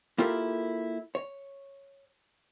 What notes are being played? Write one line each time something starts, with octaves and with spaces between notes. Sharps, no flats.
A#3 E4 F4 G4 A4 A#4
C#5